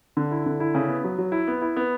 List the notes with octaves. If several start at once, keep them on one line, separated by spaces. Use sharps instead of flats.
D3
E4
D3
E4
C#3
B3
F#3
F#3
E4
B3
E4
B3